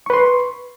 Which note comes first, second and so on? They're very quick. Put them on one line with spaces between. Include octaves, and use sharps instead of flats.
C#6 B4 C6